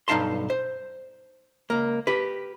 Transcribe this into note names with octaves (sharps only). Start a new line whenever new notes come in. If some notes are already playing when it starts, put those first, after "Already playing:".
B1 G2 D#4 F5 A5 C6
C5
C#2 A#3
G4 B4